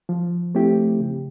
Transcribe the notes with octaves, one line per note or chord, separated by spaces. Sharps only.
F3
A3 C4 E4 G4
C#3